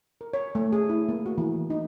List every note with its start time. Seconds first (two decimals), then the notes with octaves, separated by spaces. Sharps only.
0.21 A#4
0.33 C#5
0.55 A3
0.73 G#4
0.89 E4
1.09 A#3
1.26 F#4
1.38 E3
1.70 D#4